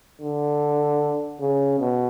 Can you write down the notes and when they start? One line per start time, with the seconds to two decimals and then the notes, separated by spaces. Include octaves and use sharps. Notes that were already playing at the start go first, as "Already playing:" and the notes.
0.21 D3
1.41 C#3
1.80 B2